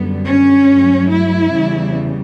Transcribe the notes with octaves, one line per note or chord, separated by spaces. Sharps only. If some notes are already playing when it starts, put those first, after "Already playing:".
Already playing: F#2 D3 G3 B3
C#4
G2 F#3 A3
E4
E2 C#3 G3